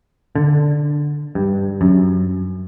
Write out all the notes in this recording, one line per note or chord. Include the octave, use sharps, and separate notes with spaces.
D3
G2
F#2